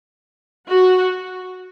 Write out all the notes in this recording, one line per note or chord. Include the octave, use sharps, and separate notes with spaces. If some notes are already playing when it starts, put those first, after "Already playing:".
F#4